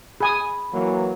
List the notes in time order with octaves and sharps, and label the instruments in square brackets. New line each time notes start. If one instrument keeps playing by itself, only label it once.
[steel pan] G#4 G#5 D#6 [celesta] B5
[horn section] E3 F#3 A#3